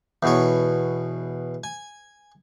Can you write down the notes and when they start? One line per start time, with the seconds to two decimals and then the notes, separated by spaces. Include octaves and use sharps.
0.23 E2 B2 C#5
1.64 G#5